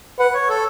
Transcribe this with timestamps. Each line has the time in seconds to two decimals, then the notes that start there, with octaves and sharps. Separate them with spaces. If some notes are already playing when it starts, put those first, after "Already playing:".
0.19 B4 F#5
0.34 C#5
0.49 A4